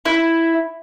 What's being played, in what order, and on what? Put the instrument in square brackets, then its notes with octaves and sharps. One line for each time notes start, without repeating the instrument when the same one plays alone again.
[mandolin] E4